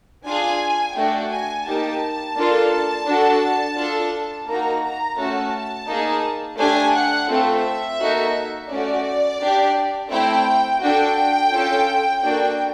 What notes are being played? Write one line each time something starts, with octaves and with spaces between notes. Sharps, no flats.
D4 F4 G#4 G#5
A3 D4 F#4 G5
G#5
A#3 D#4 G4 A5
A#3 D4 F4 A4
D4 F#4 A4
D4 F4 A4
A#3 D#4 F#4 A#5
A#5
A3 C#4 F#4 A5
A#3 D#4 G#4
A3 D4 G4 G#5
F#5
A3 C4 F4 A4 E5
A#3 D#4 F#4 A4
A3 C#4 F#4 D5
D4 G4
A3 C4 E4 G5
D4 F#4 A4 G5
C#4 F4 A4
A#3 D4 F#4 A4 G5